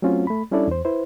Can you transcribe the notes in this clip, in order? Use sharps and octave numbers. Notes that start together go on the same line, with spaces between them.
F#3 A3 C4 C#4 F4 F#4
A3 B5
G3 C#4 D4 E4 A4 D5
E2 C5
E4 B4 C5